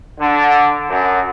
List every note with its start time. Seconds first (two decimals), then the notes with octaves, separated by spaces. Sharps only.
0.19 D3
0.89 F#2